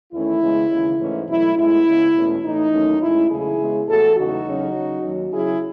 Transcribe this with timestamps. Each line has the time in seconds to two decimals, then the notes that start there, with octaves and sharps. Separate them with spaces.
0.13 E2 D#3 A3 C#4 E4
0.42 C#3 G#3 B3
0.71 D#2 C#3 E3
1.00 G#2 E3 A3 C#4
1.28 B2 F#3 A3 E4
1.57 A2 G#3 B3 E4
1.86 C#3 G#3 B3
2.15 E2 B2 A3 C#4
2.44 A2 E3 A3 D#4
2.72 D#2 D#3 F#3 A3 C#4
3.01 A2 G#3 C#4 E4
3.29 E2 C#3 F#3 A3 E4 G#4
3.59 C#3 G#3 B3
3.87 A2 E3 B3 F#4 A4
4.16 E2 C#3 F#3 A3 D#4 F#4
4.45 E2 C#3 F#3 C#4
4.74 C#3 F#3 C#4
5.02 D#2 D#3 F#3 C#4
5.31 C#3 F#3 C#4 E4 G#4